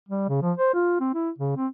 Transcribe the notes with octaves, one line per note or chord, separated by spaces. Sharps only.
G3
C#3
F3
C5
F4
C4
E4
C#3
C4